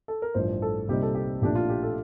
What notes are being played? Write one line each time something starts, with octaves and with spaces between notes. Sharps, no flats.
A4
A#4
A1 G2 F3 C5
A4
C2 A#2 G3 C4 D#4 G4
A4
G4
A#1 A2 F3 A3 D4 G4
F4
G4
A4